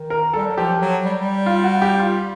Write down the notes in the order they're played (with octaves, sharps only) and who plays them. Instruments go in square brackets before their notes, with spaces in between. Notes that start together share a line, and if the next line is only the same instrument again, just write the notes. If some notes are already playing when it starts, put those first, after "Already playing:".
Already playing: [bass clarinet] D#3
[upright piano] A#4
[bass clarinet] G3 [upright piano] A4
[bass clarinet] F#3
[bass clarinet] F3 [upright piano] G4
[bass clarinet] F#3
G3
G3
[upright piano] F4
F#4
G4
F4